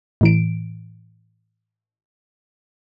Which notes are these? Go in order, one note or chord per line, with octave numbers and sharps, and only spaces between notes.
A2 E3 D7